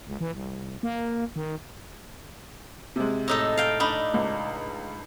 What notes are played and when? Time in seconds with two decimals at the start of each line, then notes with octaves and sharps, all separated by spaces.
0.07 C#2
0.20 E3
0.34 C2
0.83 A#3
1.36 D#3
2.96 C3 G#3
3.28 A2 D#4 A4
3.57 F5 G5
3.80 D4 D#4 B5
4.14 C#2